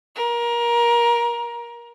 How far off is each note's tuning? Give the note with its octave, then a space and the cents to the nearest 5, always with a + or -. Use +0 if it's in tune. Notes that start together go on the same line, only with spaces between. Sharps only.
A#4 +20